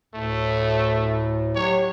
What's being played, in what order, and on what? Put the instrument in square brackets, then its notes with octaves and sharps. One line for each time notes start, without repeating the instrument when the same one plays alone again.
[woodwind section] D2 A2 [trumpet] A3
[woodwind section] F#3 G4 [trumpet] C#5